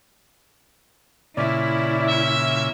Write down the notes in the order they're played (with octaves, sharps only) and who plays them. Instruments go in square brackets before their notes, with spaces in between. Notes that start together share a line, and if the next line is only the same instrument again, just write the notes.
[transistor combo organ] A#2 C#3 [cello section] E4 [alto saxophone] D5
[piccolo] E5